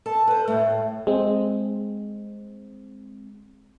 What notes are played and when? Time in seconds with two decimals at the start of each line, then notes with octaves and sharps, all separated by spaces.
0.06 A4 A5
0.28 B4 C5
0.48 A2 A3
1.07 G#3 C4